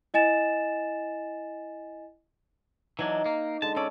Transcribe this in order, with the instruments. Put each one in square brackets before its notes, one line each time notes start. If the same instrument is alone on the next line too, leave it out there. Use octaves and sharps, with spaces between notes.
[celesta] E4 D#5 G#5 A6 E7
[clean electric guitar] E3 F#3 D4 [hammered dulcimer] D#4
[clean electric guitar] A#3
[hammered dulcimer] D3 G#3 [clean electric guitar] A5
[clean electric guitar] C#4 A4 D5 [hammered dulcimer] C#5